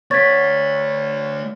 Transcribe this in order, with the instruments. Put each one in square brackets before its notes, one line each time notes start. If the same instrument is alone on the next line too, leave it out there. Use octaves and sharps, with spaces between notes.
[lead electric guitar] A3 D5 [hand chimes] C#5 A6 [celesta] C#6 G#6 B6